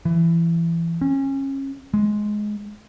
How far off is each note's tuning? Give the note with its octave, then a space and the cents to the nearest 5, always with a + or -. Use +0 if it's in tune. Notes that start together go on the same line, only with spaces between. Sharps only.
E3 +25
C#4 -25
G#3 +10